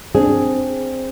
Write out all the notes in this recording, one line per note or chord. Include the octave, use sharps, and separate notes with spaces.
C4 D4 G#4